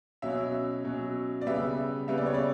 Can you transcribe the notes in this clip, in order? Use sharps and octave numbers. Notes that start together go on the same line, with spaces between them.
B2 F#3 C#4 E5
B2 F#3 C#4
D5
C#3 G3 B3 E5
C#3 G3 B3 E5
D5
C#5
D5